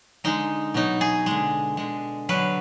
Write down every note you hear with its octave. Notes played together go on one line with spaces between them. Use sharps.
D3 G#3 D#4
B2 F#3 D#4
G#4
D3 G#3
D3 G#3
D3 F#3 B4